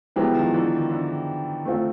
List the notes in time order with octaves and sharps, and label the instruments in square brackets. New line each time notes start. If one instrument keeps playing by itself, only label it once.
[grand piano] E3 F#3 [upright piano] G#3 B3 E4 G4 C5
[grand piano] D#3 F3
D3 E3
D#3
D3
[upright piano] A3 C4 F4